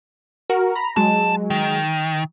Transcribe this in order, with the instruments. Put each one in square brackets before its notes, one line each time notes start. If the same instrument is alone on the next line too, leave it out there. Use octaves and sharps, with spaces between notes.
[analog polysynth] F#4 A#4
A#5 B5
[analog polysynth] F#3 G#3 [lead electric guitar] A5
[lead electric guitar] D#3